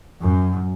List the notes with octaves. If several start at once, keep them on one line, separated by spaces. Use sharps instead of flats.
F#2